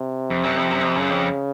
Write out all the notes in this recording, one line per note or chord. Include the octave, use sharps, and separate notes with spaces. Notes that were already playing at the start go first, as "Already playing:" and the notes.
Already playing: C3
F2
F#2
F2
F#2
F2
F#2 C#3
F2